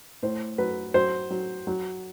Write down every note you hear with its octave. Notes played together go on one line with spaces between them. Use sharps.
A2 C5
F#3 B4
F#3 C5
F#3
F#3